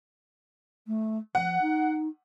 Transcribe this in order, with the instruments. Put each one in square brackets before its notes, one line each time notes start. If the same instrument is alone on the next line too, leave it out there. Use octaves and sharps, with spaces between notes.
[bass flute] A3
[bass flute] F3 [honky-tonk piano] F#5
[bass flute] D#4